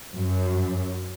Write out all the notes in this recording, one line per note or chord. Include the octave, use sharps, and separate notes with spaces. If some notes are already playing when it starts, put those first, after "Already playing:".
F#2